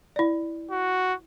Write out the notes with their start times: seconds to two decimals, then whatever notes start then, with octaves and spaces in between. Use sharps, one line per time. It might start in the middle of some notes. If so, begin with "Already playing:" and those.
0.16 E4 D5
0.71 F#4